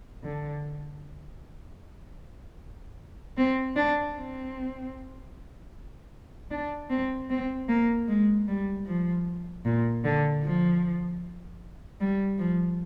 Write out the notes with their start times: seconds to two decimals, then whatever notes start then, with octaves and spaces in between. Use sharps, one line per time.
0.24 D3
3.37 C4
3.76 D4
4.17 C4
6.51 D4
6.90 C4
7.30 C4
7.69 A#3
8.08 G#3
8.48 G3
8.87 F3
9.65 A#2
10.04 D3
10.43 F3
12.01 G3
12.39 F3